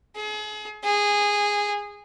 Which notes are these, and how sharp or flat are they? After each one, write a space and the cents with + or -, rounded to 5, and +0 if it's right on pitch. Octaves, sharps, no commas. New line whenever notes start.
G#4 +35
G#4 -15